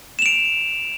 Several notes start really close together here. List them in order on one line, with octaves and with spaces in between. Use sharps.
E7 F7 D7